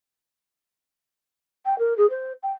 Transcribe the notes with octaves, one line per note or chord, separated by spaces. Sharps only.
G5
A#4
G#4
C5
G5